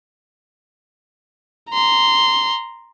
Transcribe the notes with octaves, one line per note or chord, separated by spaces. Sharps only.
A#5 C6